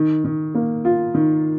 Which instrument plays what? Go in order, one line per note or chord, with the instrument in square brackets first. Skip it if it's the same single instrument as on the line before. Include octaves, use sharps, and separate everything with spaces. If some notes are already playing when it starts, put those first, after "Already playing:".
Already playing: [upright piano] D#3
D#3
A#3
F4
D#3